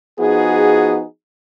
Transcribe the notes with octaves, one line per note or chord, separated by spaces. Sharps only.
F3 B3 D#4 F#4 G#4